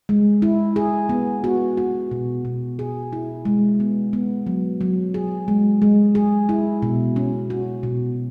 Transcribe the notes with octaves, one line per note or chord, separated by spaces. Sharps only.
G#3
E4
G#4
B3
F#4
F#4
B2
B2
G#4
E4
G#3
B3
B3
F#3
F#3
G#4
G#3
G#3
G#4
E4
B2
C#4
F#4
B2